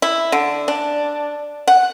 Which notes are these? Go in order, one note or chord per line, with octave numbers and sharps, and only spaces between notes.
E4
D3
D4
F#5